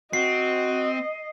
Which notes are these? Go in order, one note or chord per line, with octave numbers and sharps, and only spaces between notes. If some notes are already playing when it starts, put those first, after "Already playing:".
C4 F#4 D#5 C7